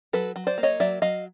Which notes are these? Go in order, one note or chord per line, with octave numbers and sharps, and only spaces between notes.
F#3 A4 B4
F#3
C5 D5
A#3
C#5 D#5
F#3 D5 E5
F#3 D#5 F5